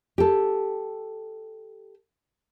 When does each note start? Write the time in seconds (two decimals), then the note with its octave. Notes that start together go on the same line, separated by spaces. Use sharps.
0.18 G4 A4